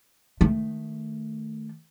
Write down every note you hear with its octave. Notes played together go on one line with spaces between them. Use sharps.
D#3 A3